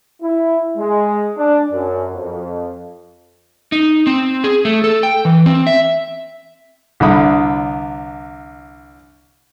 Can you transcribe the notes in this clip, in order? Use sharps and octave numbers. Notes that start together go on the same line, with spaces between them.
E4
G#3
D4
F#2
F2
D#4
C4
G#4
A3
A4
G5
E3
C4
E5
C2 D3 E5 B5 D#6